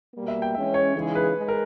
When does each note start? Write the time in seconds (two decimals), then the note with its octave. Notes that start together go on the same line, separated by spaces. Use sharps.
0.15 B2 G3 A#3
0.28 E5
0.42 G5
0.54 E3 G#3 C#4 E5
0.74 C#5
0.95 C#3 E3 G#3 D#4 G#4
1.15 B4
1.35 G#3
1.48 A#4